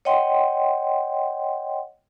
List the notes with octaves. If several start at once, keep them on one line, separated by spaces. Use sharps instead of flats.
C#5 D#5 F#5 G5 C6